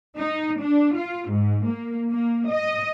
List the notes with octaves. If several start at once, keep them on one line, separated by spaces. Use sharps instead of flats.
D#4
D4
F4
G#2
A#3
A#3
D#5